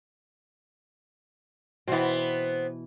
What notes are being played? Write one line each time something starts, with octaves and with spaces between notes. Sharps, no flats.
B2 E3 B3 C4